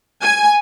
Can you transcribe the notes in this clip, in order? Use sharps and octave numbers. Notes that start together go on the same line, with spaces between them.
G#5